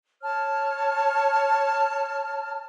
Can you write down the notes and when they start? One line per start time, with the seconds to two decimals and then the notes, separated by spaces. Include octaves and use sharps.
0.23 C#5 A5 F6